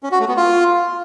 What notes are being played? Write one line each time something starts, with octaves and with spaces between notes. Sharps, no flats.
C#4
F#4
A3
B3
F4